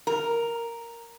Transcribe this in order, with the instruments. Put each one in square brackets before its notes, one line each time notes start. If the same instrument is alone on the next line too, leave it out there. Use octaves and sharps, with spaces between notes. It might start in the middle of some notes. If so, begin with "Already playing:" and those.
[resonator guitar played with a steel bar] A#4